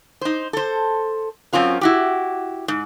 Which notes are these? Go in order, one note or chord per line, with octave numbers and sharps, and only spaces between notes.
D#4 C5
A4 C5
F#2 C4 C#4 F4 A#4
E4 F#4 G4
G#2